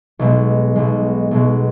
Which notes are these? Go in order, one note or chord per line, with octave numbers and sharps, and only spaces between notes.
B1 B2 G#3
B1 B2 G#3
B1 B2 G#3